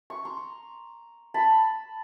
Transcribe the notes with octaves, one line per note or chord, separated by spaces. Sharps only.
C#6
A#5 C6
A5 B5